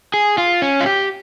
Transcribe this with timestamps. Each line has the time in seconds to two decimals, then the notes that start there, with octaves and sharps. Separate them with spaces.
0.14 G#4
0.38 F4
0.62 C#4
0.81 F4
0.86 G4